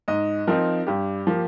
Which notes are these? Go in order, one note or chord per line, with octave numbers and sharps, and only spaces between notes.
G#2 D#5
F3 C4 D#4 A#4
G2 G4
F3 A#3